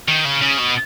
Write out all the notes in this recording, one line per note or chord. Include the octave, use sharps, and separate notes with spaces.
D#3
C#3
C#3
B2